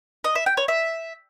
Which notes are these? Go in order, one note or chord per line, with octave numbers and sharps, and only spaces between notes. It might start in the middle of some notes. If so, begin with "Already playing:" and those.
D#5
E5
G5
C#5
E5